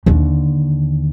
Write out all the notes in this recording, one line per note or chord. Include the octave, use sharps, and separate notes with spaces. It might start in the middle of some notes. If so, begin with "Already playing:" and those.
D#2 D3